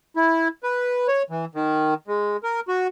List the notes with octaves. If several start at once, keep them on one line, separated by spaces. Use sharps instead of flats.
E4
B4
C#5
E3
D#3
G#3
A#4
F#4